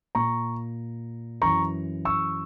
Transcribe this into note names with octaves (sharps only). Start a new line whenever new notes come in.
A#2 A#5 C#6
F#2 E3 A#5 C#6
C#6 E6